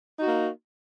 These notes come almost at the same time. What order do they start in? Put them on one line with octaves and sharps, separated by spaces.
D#4 F#4 A#3